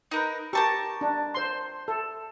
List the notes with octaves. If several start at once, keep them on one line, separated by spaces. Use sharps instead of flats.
D#4 A#4 B4
G4 A#4 A5 C#6
D4
C5 C6
A4